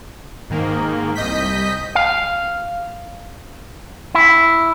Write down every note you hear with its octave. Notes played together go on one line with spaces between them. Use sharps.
G#2 D#3 A#3
C2 D#5 G6 B6
F5
E4